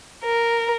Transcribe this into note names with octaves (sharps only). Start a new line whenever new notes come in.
A#4